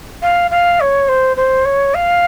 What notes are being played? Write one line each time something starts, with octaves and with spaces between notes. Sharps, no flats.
F5
F5
C#5
C5
C5
C#5
F5